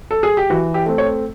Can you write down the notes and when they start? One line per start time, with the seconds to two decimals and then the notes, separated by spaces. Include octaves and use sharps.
0.11 A4
0.23 G#4
0.37 G4
0.50 E3 F#4
0.74 G4
0.86 A3 C4
0.98 C#5